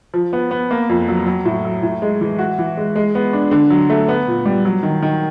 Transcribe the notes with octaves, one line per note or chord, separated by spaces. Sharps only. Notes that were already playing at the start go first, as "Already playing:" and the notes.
F3
B3
B3
A#3
F2
F#3
F#3
A2
F#3
A2
G#3
E3
F#4
E3
G#3
G#3
B3
D4
D3
F#3
A3
B3
A#2
G3
F#3
D#3
D#3